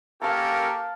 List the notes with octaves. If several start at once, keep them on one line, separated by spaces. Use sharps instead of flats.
A#3 C#4 G4 A4 A#4 F5 A5